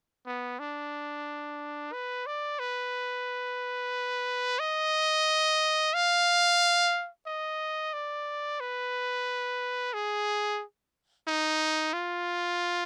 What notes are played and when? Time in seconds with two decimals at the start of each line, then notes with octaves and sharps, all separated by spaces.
0.26 B3
0.59 D4
1.93 B4
2.26 D5
2.59 B4
4.59 D#5
5.94 F5
7.26 D#5
7.93 D5
8.60 B4
9.93 G#4
11.27 D#4
11.93 F4